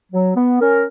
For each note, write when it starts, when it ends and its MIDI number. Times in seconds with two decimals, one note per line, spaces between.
0.12 0.30 54
0.35 0.57 59
0.60 0.83 61
0.60 0.83 70